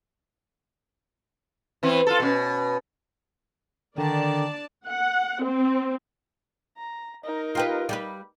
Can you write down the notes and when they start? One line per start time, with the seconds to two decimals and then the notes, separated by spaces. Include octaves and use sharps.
1.83 E3 B3 C4
2.07 F4 A4
2.20 B2 C#4
3.98 D3 D#3 D4 D5 A5
4.87 F#5
5.44 C4
6.77 A#5
7.24 D#4 A#4
7.55 F4 G4 B4
7.89 G3 G4 B4